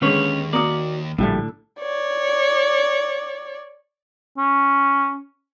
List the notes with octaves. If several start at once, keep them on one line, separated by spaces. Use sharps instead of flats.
D#2 D3 G#3 C#4 B4 C#5
A#3 F#4 D5 D#6
A#1 A2 D3 G3 A3
C#5 D5
C#4